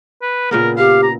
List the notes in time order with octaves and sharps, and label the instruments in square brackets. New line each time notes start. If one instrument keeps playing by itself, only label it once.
[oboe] B4
[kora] A#2 C#3 B3 [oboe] A#4
[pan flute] G4 [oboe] F5
[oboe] A#5